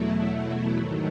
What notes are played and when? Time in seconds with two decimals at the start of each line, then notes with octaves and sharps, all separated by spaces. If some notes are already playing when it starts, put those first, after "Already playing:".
Already playing: E2 B2 F#3 A3 E4
0.75 G#2 D#3 F#3 A3